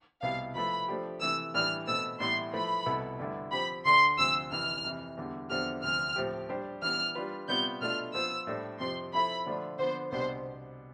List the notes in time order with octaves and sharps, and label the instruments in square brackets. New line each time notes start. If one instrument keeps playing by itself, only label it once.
[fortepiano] C2 B2 B3 E4 G4 [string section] F5
[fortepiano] F3 A3 E4 B4 E5 [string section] B5
[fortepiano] F3 A3 D4 G4
[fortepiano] C3 E3 A3 [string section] E6
[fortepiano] A2 E3 G3 D4 [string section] F6
[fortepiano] B2 A3 C4 [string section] E6
[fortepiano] A2 E3 G3 B3 E4 [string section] C6
[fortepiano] F3 A3 E4 B4 [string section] B5
[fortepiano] C2 B2 B3 E4 A4
G2 D3 A3 E4
[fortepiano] F3 C4 G4 [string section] B5
[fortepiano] D2 D3 A3 D4 [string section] C6
[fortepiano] D2 C3 F3 [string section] E6
[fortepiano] F2 C3 E3 [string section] F6
[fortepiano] F2 C3 E3
E2 D3 G3
[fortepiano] E2 D3 F3 C4 G4 [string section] F6
[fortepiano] D2 C3 F3 [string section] F6
[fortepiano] A2 F3 C4 G4
G3 D4 G4 C5
[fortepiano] E3 G3 B3 [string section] F6
[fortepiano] G3 D4 F4 B4
[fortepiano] C3 G3 B3 F4 [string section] G6
[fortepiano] B2 A3 D4 F4 [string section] F6
[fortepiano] F3 B3 F4 C5 [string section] E6
[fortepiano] A2 G3 D4 A4 C5
[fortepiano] F2 C3 F3 C4 G4 [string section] C6
[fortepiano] F3 C4 E4 A4 E5 [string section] B5
[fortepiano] D3 F3 A3 D4 F4
[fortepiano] D3 F3 B3 [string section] C5
[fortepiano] C2 B2 B3 D4 G4 [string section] C5